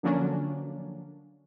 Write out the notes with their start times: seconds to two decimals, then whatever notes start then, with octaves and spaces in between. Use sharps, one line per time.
0.03 D3 F3 F#3 A#3 C#4 D4